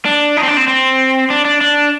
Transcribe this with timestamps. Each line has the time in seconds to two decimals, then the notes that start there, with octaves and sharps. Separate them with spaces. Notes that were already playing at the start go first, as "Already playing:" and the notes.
0.05 D4
0.37 D#4
0.43 C4
0.48 D4
0.57 C4
0.68 C4
1.30 D4
1.45 D4
1.61 D4